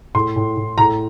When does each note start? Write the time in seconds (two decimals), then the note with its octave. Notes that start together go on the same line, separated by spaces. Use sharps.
0.15 A2 C6
0.36 A2
0.57 A2
0.78 A2 A#5